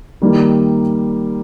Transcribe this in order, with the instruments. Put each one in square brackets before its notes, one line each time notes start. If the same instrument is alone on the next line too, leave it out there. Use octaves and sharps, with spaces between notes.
[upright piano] D#3 G3 A#3